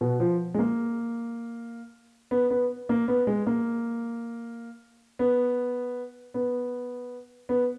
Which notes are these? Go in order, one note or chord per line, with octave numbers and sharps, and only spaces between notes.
B2
F3
G#3
A#3
B3
B3
A#3
B3
G#3
A#3
B3
B3
B3